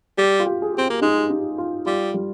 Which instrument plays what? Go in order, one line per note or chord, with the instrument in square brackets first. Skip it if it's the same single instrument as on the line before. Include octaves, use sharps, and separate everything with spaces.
[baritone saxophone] G3 [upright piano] G4
[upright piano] F4
G4
G#4
[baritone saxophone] C4 [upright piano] G4
[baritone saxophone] A#3
[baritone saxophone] G#3 [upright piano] D#4
[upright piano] D#4
F4
[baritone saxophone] G3 [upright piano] F4
[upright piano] G3